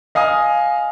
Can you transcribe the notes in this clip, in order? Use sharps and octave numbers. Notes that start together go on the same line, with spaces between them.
D#5 F5 G#5 D#6